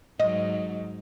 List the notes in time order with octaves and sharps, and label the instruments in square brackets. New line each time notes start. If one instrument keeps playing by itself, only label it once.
[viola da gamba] G#2 F#3 [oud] D#5